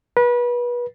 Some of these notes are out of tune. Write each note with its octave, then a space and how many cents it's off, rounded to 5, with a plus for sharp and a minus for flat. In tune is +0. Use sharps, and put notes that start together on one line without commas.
B4 -30